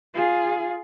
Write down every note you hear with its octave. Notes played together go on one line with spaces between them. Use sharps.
F4 G#4